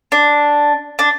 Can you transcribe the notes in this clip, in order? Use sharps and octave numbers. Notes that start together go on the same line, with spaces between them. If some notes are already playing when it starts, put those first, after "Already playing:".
D4
D4